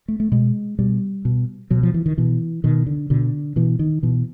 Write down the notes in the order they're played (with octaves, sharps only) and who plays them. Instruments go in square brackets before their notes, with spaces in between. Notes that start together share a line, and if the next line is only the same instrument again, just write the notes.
[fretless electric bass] A3
A3
B2 G#3
B2 G3
B2
B2 F#3
F3
E3
D#3
B2 E3
B2 D#3
D3
B2 D3
B2 E3
D#3
B2 E3